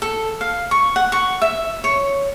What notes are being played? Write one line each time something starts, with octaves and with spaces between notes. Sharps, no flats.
A4
F5
C#6
F#5
C#6
E5
C#5